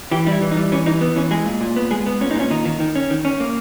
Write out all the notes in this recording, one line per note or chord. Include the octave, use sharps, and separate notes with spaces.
E3 G4
G3 D#4
E4
E3
D#4
G3
E3 C#4
E3 D#4
B3
E3 C#4
G#3 G#4
A#2
A#2
B3
G#3 G#4
B3
A#2 C#4
D#4
A#2 C#4
D#3 D#4
D#3
D#3
C#4
D#3
C#4
A#3